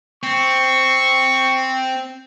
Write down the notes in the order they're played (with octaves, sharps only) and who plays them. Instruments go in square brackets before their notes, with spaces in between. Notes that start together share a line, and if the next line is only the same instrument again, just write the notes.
[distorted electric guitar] C4 [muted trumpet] C#6